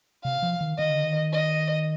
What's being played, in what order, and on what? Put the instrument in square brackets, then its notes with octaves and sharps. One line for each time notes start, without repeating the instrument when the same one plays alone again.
[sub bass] C3 [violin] F5
[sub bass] F3
D#3
[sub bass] D#3 [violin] D#5
[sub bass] D3
D#3
[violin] D#5